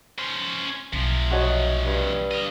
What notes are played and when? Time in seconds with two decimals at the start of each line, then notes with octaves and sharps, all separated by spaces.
0.19 C#4 C5
0.93 B1 C3 F3
1.31 F#4 C#5 D#5
1.85 G2
2.31 D#5 F5